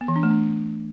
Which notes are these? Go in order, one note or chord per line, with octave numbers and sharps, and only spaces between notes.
B3
E3
D4
A3
D4